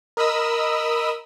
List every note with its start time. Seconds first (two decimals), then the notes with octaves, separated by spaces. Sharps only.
0.17 A#4 D#5 B5 D#6 E6